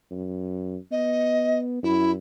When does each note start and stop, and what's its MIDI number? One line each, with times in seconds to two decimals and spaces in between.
0.11 0.76 42
0.91 1.80 59
0.91 1.59 75
1.83 2.18 42
1.83 2.11 64